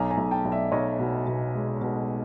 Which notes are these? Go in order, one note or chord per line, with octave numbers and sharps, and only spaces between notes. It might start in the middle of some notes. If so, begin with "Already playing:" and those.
Already playing: B1 G#5 A#5
G#5 A#5
B1
G5 A5
B1
D5 E5
B1 C#5 D#5
B2
B2
G#3
B2